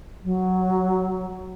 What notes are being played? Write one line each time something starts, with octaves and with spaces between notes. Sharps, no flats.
F#3